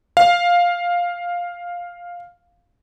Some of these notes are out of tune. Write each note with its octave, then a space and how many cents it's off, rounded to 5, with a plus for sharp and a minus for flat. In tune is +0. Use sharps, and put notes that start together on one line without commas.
F5 +5